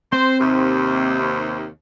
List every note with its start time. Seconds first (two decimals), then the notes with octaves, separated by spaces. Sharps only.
0.13 C4 C5 C6
0.40 D#2 C3